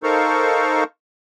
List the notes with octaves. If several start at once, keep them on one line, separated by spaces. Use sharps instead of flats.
D#4 A4 A#4 C5 F5 C#6